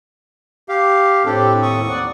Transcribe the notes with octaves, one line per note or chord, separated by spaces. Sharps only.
G4 F5
A2 C4 D4 G4 A4
D#2 C#6 D#6
D5 F#5